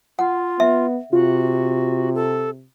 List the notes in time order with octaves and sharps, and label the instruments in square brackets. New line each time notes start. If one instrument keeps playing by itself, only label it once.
[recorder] F4 [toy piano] F#5
[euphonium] B3 [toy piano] E5
[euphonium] C3 [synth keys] F4 [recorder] F#4
[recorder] A4